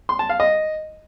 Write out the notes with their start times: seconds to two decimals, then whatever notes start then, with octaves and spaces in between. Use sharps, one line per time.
0.09 C6
0.19 A5
0.29 F5
0.40 D#5